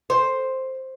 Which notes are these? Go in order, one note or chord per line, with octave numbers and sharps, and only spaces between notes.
C5